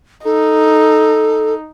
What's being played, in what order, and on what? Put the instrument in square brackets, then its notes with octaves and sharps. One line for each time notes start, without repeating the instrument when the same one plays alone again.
[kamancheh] D#4 [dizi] A4